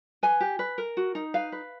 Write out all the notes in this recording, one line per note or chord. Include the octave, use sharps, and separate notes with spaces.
B4 G#5
G4
B4
A#4
F#4
D#4
B4 F5
B4